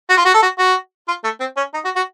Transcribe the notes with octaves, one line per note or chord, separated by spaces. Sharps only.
F#4
F4
F#4
A4
F#4
F#4
F4
A3
C4
C#4
D#4
F#4
F#4